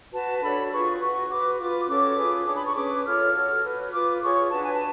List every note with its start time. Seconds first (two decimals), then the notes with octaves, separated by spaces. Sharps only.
0.12 F#4 B4 A5
0.42 D4 F#4 A4 C#5 B5
0.71 F4 G#4 B4 C#6
1.00 F#4 B4 C#6
1.29 F#4 B4 D6
1.58 F4 B4 D6
1.87 C#4 F#4 A4 C#5 D6
2.16 F4 G#4 B4
2.46 D4 G#4 C#5 D6
2.56 B5
2.65 C#6
2.75 C#4 G#4 B4 D6
3.04 F4 A4 C#5 F6
3.34 F#4 A4 C#5
3.63 F#4 B4
3.92 F4 B4 D6
4.22 F4 G#4 C#5 C#6
4.50 D4 F#4 B4 A5
4.61 G#5
4.72 A5